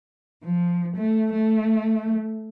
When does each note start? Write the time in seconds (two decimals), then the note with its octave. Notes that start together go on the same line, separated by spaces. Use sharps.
0.44 F3
0.96 A3
1.33 A3